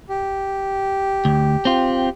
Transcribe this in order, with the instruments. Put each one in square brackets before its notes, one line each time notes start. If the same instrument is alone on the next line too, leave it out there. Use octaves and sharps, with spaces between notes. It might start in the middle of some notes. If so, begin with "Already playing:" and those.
[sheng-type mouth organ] G4
[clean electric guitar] D2
C4 F4